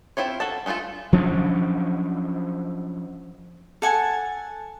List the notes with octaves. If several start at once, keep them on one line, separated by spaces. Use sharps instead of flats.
C4 E4 F4 C#5
F#4 A4 A5
G#3 A3 B3 F4 A4
F3 F#3 C#4 D4
A4 F#5 G#5 A5